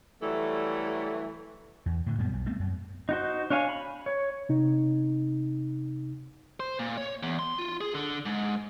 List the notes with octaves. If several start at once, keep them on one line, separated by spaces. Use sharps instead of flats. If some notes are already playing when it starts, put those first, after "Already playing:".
E3 F#3 G3 A3 A4 E5
E2
A2 D3
F#2 A#2 G3 B3
B1
G3 A3 B3 C4
F#2
D#4 F#4 C5
D4 C#5 F5 G#5
B5
C#5
C3 D#4
C5
A#2
C#5
E2
C6
F4
G#4
D3
G#2